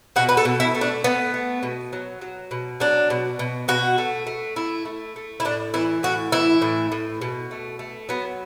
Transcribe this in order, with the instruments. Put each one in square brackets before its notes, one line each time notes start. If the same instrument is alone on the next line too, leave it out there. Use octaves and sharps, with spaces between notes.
[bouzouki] B2 F#4
B4
A4
B2
E4
A3
D4
A3 B3
A3
B2
F#3
F#3
B2
F#3 D4
B2
B2
B2 F#4
A3
A3
A3 E4
A3
A3
E4
A2 D4
E3 E4
A2 F#4
E3 E4
A2
A2
B2
A3
A3
F#3 B3